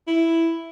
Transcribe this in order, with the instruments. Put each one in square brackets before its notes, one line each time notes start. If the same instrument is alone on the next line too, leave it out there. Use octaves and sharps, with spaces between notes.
[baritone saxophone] E4